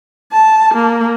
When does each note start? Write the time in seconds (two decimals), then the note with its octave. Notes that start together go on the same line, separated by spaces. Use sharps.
0.32 A5
0.75 A#3